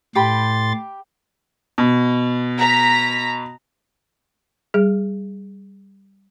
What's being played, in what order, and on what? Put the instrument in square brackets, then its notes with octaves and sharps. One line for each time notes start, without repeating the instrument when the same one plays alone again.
[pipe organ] A2 C6 A6 [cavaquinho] G4 B5
[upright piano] B2
[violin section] A#5 B6
[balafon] G3 G#4